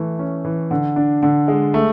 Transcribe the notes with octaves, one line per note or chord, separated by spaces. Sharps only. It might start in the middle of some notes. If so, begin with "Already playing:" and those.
Already playing: E3 A3
C#4
E3
D3
D4
D3
G#3
A3